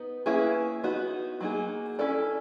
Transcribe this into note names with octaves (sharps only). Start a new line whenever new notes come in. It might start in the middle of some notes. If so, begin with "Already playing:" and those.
Already playing: B3 D#4
A#3 C#4 E4 G#4 B4
B3 D#4 F#4
F#3 A#3 D#4 G#4
C#4 E4 A4 D5